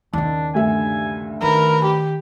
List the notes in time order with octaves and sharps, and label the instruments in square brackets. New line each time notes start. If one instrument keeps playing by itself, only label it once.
[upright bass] D#2 C#3 [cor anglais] D4
[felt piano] D2 G2 E5 [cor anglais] G#5
[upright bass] D#3 [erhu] A#4 [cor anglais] B4
[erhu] G4